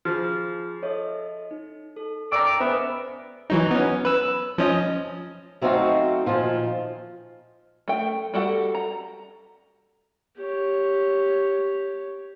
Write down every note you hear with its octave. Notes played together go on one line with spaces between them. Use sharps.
F3 F4 G#4 F6 C7
A4 C#5 D#5 E5
D#4
A4
D#3 D5 G5 A#5 D6 E6 F6
B3 G#4 C5 D#5 E5
E3 F#3 D#4
B3 C#4
B4 E6
F3 C#4 D#5
F#3 A3 C4 D#4 F#4 F5
A#2 D#3 F3 F4
A3 G5
G3 F#4 A4 F#5
A#5
G4 C#5